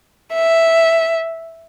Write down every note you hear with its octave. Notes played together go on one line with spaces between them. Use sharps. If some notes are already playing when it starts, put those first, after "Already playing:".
E5